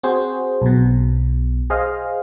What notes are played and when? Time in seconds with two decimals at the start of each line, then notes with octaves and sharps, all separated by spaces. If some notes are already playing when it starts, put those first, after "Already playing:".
0.03 C4 F#4 G#4 C5
0.62 B1 B2
1.70 G#4 C5 D#5 F5